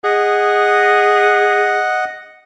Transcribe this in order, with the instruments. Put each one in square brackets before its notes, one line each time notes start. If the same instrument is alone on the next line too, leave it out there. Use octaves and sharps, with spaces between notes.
[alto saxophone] G#4 [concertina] D#5 F#5